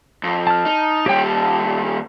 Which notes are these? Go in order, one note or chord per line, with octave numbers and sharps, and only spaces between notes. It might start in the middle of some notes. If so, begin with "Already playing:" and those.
F2
A5 F6
D#4
D#2 G3 G4 C#5 G5
A5